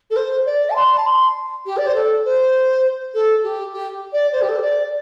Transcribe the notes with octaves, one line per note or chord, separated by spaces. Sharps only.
A4
C5
D5
A5
C6
A5
C6
G4
D5
C5
A4
C5
A4
G4
G4
D5
C5
G4
A4
C5
D5